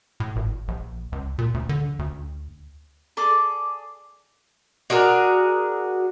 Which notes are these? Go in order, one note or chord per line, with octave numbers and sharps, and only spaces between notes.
A2
G#1
A#1
C#2
A#2
D2
D3
D2
G#4 A4 D5 D6
D4 F#4 G#4 A#4